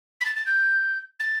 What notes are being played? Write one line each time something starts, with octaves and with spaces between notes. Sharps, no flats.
B6
A6
A6
G6
A6